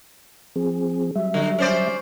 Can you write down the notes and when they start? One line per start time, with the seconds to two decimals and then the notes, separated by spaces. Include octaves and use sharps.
0.56 F3 C4 G#4
1.16 F#3 G3 E5
1.34 D3
1.59 C#4 C5 D5